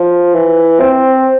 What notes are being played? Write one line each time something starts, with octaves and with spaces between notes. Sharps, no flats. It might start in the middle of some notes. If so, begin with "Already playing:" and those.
Already playing: F3
E3
C4